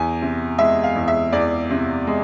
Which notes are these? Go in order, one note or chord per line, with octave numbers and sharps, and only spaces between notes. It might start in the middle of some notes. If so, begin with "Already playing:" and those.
Already playing: E2 G#5
C3
G#3 E5
F5
E2
E5
E2 D5
C3
G#3